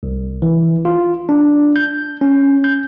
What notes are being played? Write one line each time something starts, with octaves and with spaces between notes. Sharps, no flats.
C2
E3
F4
D4
G6
C#4
G6